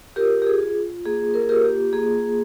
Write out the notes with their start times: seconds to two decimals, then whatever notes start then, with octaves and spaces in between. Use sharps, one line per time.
0.16 F4 G4 A#4
0.42 G4
0.47 G#4
0.60 F4
1.05 A#3 G#4
1.34 A#4
1.42 G#4
1.49 F4 G4 A#4
1.64 G4
1.93 A#3 G#4